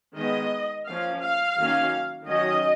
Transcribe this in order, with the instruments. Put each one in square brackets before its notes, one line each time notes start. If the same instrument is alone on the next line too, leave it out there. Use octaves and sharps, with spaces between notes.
[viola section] D#3 G#3 B3 D#5
F3 A#3 C#4 F5
F5
D#3 F#3 A#3 C#4
D#3 F#3 C#4 D#5